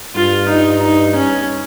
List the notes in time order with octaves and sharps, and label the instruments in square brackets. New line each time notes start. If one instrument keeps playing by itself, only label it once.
[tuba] G2 [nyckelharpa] F4
[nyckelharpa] D#4
D#4
C#4